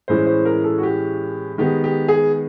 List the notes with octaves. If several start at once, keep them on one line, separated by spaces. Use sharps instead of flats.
A2 E3 G#3 C#4 C5
C5
A#4
A4
F#4
G4
D#3 G#3 B3 G4
G4
G#4